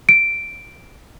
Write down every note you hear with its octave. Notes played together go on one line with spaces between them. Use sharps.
D7